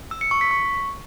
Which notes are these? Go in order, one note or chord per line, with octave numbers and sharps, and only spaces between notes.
E6
C#7
C#6
B6
C#6